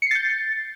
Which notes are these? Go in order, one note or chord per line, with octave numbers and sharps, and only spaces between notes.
G6 A6 C7 C#7